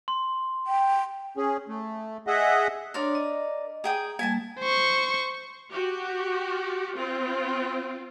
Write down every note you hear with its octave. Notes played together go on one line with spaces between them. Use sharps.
C6
G5
C#4 G#4
A3
G#4 D#5 E5 F#5
D4 A#4 C#5 D5 C6
D#5
G#4 G5 A#5 D#6
G3 A#3 G#5 A5
C5 C#6
F#4 G4
C4 F4